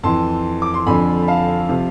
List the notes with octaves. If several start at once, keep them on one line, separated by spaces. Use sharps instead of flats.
F2 E3 A5 C6
D6
C6
F2 D3 F3 G#5 B5
B5
F5 A5
C3 F3